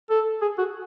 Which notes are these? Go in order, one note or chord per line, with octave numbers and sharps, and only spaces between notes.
A4
G#4
F#4